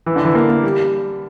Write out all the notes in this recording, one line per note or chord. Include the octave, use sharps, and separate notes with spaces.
E3
D3
E3
A#3
A#3
G3